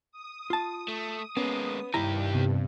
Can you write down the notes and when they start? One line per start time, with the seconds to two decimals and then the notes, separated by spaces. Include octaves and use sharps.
0.11 D#6
0.50 F4 A5
0.88 A3
1.37 G#3 A#3 B3 C#4
1.94 C2 G2 D#3 E4 G4 A#5
2.35 C3 B3